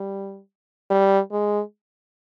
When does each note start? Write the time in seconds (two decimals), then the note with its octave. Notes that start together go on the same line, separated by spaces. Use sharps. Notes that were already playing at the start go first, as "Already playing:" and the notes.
Already playing: G3
0.90 G3
1.32 G#3